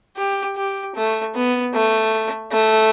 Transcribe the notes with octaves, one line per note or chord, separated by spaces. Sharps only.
G4
G4
A3
B3
A3
A3